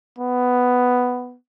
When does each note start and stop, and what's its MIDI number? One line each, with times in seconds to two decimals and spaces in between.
0.19 1.36 59